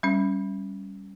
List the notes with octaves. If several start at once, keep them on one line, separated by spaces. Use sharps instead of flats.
G3 C#4